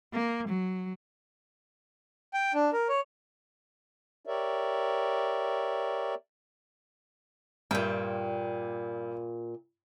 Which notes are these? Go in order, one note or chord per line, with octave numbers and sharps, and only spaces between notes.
A#3
F#3
G5
D4
A#4
C#5
G4 A#4 C#5 D5 E5
G2 A#2 G5